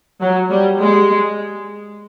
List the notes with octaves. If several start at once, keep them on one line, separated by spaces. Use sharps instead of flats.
F#3
G3
G#3